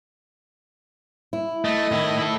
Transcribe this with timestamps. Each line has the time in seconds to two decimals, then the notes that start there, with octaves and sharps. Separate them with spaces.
1.33 E4
1.65 A3 D#5
1.92 A2 D#3 E4
2.17 E4 A4